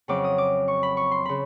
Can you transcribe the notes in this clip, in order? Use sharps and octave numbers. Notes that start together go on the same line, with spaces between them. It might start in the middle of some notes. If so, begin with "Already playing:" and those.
F2 C#3 F#3 D6
D#6
D6
C#6
B5
C#6
C6
C#3 B5